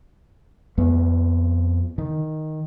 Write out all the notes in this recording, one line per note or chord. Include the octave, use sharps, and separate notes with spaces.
F2 B3
D#3